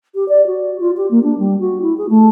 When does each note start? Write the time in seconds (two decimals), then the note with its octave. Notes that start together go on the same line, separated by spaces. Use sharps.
0.15 G4
0.29 D5
0.47 F#4
0.80 F4
0.97 G4
1.11 A#3
1.23 D4
1.39 G3
1.60 F#4
1.82 E4
1.98 G#4
2.10 A3